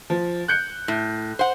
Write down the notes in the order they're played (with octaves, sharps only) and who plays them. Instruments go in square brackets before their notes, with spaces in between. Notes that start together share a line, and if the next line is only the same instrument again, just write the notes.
[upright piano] F3
F#6 G6 C#7
[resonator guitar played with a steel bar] A2
C5 F#5